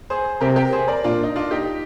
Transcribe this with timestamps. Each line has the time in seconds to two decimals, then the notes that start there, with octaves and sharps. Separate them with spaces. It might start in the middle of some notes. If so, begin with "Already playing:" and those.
0.10 G#4 C5
0.41 C3 G4 A#4
0.56 G4 A#4
0.72 G#4 C5
0.88 A#4 D5
1.04 A#2 D4 F4
1.23 D#4
1.36 D4 F4
1.51 D#4 G4